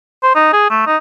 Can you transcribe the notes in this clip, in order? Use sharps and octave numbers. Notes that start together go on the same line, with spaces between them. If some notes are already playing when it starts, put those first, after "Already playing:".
C5
D#4
G#4
A3
D#4